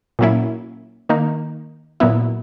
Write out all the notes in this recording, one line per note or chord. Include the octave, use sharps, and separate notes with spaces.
A#2 F#3 A#3 C#4 E4
D#3 A#3 D#4
A#2 F#3 B3 E4